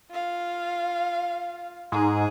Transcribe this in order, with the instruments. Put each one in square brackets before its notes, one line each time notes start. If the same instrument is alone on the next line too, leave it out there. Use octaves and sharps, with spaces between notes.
[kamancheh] F4 F5
[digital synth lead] G#2 [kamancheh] G#4